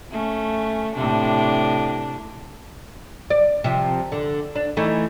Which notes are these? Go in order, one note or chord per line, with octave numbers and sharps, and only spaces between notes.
A3 C#4
A2 C3 D4
D5
C3 F3
D3
D4
E3 A3 D#4